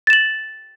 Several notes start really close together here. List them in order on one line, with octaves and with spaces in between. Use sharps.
A6 E7 F#7